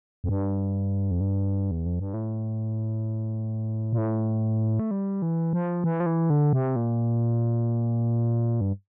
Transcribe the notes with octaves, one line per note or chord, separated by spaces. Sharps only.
F2
G2
F2
G2
E2
F2
G2
A2
A#2
A2
A3
G3
E3
F3
E3
F3
E3
D3
C3
A#2
G2